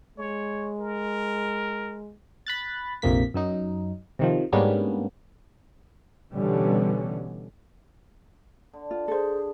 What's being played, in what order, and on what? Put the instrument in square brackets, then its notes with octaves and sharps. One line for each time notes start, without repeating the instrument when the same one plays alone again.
[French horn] G#3 [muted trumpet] C#5
[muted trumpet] A#4
[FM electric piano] B5 F#6 A6
A#1 F2 C3 A#3 B6
F#2 F#3 D#4
C3 D#3 F3
G#2 G3 A#3 B3 C#4 D4
[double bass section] B2 D3 E3 G3 C#4
[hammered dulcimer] D3
[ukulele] F4
[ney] G#4 [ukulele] A4 C5